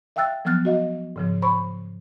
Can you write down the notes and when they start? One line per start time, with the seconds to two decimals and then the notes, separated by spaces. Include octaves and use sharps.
0.16 E5 F5 G5 E6 F#6 A6
0.45 F3 F#3 B3 F6 F#6 A6
0.65 F#4 D#5 F5
1.16 G#2 C#3 F3
1.42 C5 B5 C#6